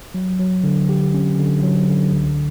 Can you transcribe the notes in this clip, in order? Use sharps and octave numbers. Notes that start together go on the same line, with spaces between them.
F#3
F#3
D3
G4
C#4
D3
F#3
D3
C#2